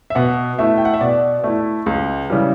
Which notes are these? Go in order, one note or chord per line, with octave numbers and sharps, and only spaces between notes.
E5
B2 F#5
A3 E4 E5
G5
F#5
E5
B2 D5
A3 E4
C#2
C#3 E3 G3